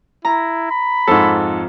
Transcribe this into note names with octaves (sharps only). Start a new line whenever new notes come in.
E4 A#5
B5
F2 G#2 A4